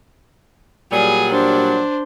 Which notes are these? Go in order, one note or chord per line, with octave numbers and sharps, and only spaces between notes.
A#2 F#3 G3 G#4
D4 C5